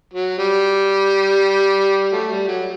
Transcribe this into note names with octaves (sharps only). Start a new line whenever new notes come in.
F#3
G3
F#3 A3
G3
F#3